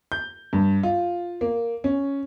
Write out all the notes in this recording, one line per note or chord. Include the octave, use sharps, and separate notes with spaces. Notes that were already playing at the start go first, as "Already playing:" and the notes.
G6
G2
F4
A#3
C#4